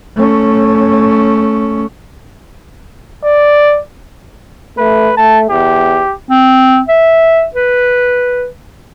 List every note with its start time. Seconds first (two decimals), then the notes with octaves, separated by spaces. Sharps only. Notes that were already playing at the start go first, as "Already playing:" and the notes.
0.16 A3 C#4
3.25 D5
4.78 A3 B4
5.17 A3 A5
5.50 E2 G4
6.30 C4
6.88 E5
7.54 B4